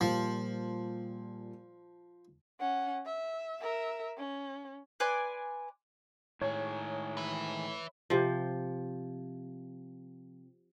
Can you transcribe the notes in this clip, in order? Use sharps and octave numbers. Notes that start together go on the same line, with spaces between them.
A#2 F3 G3
C#4 F#5
E5
A#4 E5
C#4
B4 D5 G#5 C6
A2 D#3 G#3 G#4 C#5
B4 E5
C3 F3